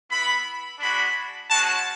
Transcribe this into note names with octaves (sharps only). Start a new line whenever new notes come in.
B3 E4 B5
G#3 D4 F#4 B5
G#3 C#4 F#4 A5